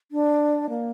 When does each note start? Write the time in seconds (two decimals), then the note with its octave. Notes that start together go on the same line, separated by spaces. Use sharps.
0.12 D4
0.69 A#3